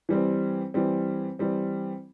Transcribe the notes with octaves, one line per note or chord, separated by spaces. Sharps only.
E3 G3 C4
E3 G3 C4
E3 G3 C4